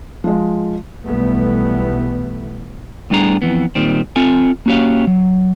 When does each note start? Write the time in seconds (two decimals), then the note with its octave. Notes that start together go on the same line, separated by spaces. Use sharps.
0.24 F3 G#3
1.04 B1 E3 G3 A3 B3
3.10 A2 G3 B3 D4 G#4 A#5
3.42 F2 G#2 E3 B3
3.75 A#2 D#3 G3 C4
4.16 C4 F4 A4 G#5
4.66 A#3 C#4 F#4 G4 C#5 F5
5.07 F#3